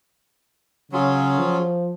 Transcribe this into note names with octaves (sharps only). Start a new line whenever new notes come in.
C#3 F#3 C#4 F4 G#4
F3